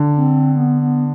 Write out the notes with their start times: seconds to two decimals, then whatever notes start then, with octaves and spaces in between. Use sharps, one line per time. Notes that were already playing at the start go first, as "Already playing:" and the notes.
Already playing: D3
0.16 C4
0.56 B3
0.82 B3